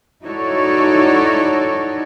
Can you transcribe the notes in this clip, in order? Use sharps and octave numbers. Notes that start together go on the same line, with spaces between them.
D#4 E4 F#4 A4 C#5 D5